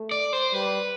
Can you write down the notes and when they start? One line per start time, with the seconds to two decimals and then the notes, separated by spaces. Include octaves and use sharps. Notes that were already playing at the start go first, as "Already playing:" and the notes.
Already playing: A3
0.11 D5
0.33 C5
0.54 G3 B4